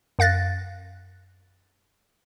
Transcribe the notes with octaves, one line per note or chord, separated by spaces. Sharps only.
F#2 F5 F#6 A6 A#6